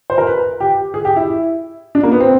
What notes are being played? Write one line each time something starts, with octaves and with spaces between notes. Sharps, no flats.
C5
A#4
B4
G4
G#4
G4
E4
D4
A#3
B3
C4